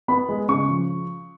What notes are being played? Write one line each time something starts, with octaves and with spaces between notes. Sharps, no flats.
B3 B5
G#3
C#3 C#6
F3